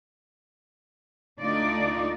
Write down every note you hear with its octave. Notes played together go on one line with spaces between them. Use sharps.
D2 A3 D4 D#4 F4 D5